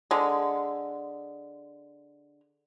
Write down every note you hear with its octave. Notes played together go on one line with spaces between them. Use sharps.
D3 G#3